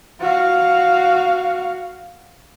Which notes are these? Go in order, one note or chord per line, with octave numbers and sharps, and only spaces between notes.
F#4 F5